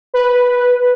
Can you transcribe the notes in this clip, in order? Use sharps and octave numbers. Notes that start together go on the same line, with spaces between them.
B4